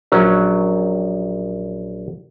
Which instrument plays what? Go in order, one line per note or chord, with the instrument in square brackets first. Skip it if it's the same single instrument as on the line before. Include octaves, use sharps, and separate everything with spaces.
[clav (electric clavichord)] A#1 F#3 C#4